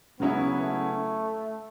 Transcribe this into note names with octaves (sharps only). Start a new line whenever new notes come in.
C#3 F#3 B3 C#4 E4
A3